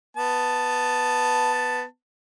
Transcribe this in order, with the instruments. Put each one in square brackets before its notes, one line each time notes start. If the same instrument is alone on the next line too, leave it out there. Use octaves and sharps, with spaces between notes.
[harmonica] B3 A5